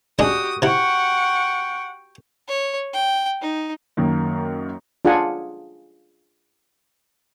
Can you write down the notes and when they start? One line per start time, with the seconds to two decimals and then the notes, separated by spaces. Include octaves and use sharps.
0.19 G#3 C#4 D4 F#4 G4 D#6
0.62 C3 E4 F#5 G5 C#6
2.48 C#5
2.93 G5
3.42 D#4
3.97 F#2 D#3 A#3
5.05 D4 F4 G#4 F#5 G#5